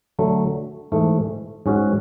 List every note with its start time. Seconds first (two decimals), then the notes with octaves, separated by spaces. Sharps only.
0.19 D3 F#3 A3
0.92 G#2 E3 A3
1.66 G#2 G#3 C#4 F#4